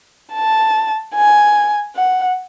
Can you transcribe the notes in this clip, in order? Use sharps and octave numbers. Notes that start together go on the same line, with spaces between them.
A5
G#5
F#5